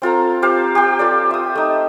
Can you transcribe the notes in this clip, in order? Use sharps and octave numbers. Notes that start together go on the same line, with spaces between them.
C4 F4 A4 A#5
G4 C5 F5
G4 G5
F4 A4 D5
E5 D#6
A3 D#4